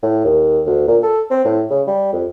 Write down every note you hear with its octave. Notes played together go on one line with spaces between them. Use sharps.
A2
D#2
D2
A#2
A4
C4
A2
C#3
G3
F2